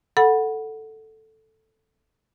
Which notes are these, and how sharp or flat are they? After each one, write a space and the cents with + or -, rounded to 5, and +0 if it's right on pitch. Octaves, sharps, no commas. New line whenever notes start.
A4 +0 F#5 +0 B5 -15